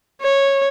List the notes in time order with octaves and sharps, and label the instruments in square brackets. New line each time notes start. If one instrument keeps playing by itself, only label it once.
[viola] C#5